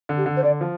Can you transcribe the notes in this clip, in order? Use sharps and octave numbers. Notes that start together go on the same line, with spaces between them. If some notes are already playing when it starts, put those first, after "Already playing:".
D3
G4
D3
C5
D3 D5
F3